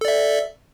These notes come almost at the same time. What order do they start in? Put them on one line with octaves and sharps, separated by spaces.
A4 D5 E5